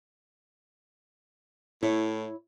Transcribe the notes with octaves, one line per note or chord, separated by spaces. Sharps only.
A2 E4 C#5